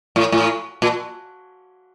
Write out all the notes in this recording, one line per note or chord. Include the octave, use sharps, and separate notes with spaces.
A2
A2
A#2